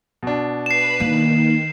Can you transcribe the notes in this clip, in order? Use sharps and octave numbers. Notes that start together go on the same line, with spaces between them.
B2 D4
B4 C7 E7
D#3 A#3